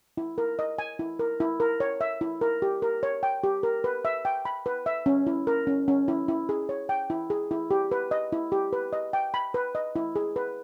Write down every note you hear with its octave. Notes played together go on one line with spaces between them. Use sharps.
E4
A#4
D#5
G#5
E4
A#4
E4
A#4
C#5
E5
E4
A#4
G4
A#4
C#5
G5
G4
A#4
B4
E5
G5
B5
B4
E5
C#4
E4
A#4
C#4
C#4
E4
E4
G#4
C#5
G5
E4
G#4
E4
G4
B4
D#5
E4
G4
B4
D#5
G5
B5
B4
D#5
E4
G#4
B4